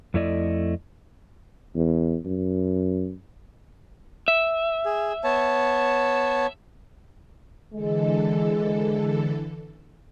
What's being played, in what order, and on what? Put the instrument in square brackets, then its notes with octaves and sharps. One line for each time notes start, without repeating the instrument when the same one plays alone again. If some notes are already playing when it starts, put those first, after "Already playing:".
[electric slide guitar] F2 A3 E4 D5 D#5
[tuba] E2
F#2
[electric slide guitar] E5
[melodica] G#4
B3 C#5 A5
[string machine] D3 E3 A4 [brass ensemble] G#3